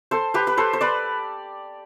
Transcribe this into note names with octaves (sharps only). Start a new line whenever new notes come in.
A4 C5
G4 B4
B4
A4 C5
C5
B4 D5